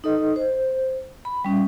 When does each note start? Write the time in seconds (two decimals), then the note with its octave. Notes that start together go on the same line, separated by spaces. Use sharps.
0.04 D#4 A4 D#5
0.36 C5
1.25 B5
1.44 G3 C#4